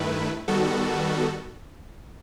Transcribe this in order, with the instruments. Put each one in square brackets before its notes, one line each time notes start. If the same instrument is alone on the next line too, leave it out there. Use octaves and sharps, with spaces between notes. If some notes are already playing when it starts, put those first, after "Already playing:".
Already playing: [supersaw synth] G2 D#3 A3 E4 B4
D#3 G3 B3 F#4 A4